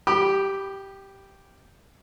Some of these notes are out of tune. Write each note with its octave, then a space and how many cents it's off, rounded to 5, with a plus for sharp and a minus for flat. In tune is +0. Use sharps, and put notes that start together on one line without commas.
G4 -5 B5 +0 D6 +45